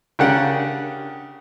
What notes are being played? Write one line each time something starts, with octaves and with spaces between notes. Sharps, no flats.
C#3 D4 G4 A#4 F#5